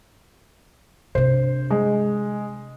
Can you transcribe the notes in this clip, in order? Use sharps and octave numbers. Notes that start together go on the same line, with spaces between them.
C3 D4 C5
G#3